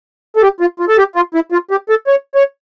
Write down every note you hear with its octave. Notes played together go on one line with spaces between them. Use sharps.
A4
G4
F4
F4
A4
G4
F4
E4
F4
G4
A4
C#5
C#5